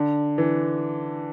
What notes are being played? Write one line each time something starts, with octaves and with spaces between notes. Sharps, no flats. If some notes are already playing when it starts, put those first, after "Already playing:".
Already playing: D3
E3